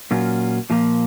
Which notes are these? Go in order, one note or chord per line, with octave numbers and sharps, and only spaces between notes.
A#2 F#3 C#4 F4
A#2 F3 A#3